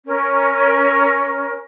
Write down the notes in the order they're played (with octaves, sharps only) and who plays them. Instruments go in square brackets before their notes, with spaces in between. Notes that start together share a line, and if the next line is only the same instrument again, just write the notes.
[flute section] C#4 A#4